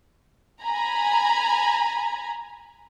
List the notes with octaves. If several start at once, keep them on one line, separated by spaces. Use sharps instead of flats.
G#5 A#5 B5